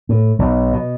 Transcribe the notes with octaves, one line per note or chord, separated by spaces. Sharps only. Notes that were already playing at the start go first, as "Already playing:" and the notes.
A2
B1
B2